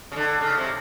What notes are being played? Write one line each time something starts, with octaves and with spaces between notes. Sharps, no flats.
C#3
D3
C#3
C3